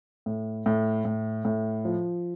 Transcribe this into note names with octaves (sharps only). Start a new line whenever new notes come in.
A2
A2
A2
A2
F3